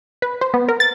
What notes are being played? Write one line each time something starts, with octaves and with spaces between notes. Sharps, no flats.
B4
C5
B3
A#4
A6